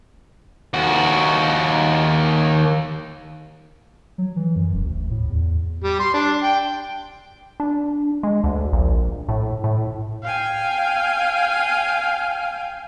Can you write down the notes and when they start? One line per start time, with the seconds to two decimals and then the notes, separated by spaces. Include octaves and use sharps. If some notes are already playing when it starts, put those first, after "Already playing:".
0.73 D#2 F#4
4.18 F#3
4.36 E3
4.56 F#2
4.74 E1
4.85 D2
5.11 A2
5.29 E2
5.84 G3
5.99 C6
6.14 D4
6.43 G5
7.60 D4
8.23 G#3
8.44 D2
8.73 A#1
9.29 A2
9.64 A2
10.22 F5 G5 G#5